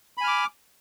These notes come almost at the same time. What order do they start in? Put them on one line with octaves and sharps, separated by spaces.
B5 G#5 F6 D6